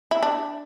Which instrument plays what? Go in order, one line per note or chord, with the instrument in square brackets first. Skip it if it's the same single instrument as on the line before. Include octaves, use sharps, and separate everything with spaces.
[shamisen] E4
D4